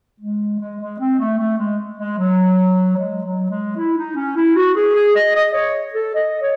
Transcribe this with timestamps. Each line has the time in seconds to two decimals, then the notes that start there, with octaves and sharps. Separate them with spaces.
0.20 G#3
0.59 G#3
0.80 G#3
0.99 C4
1.18 A3
1.38 A3
1.58 G#3
1.97 G#3
2.18 F#3
2.97 G#3
3.23 F#3
3.50 G#3
3.77 E4
3.97 D#4
4.15 C#4
4.36 E4
4.56 F#4
4.75 G#4
4.95 G#4
5.15 D#5
5.35 D#5
5.54 C#5
5.94 A4
6.15 D#5
6.41 C#5